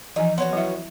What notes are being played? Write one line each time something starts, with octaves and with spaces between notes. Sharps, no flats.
E3 F3 D#4 G#5
B3 C#4 F#4 C6
F#3 E4 E5